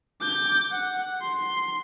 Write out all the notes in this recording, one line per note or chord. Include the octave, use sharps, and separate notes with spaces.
D6 G6
F#5
C6